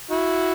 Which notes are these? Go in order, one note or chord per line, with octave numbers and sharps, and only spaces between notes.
E4 F#4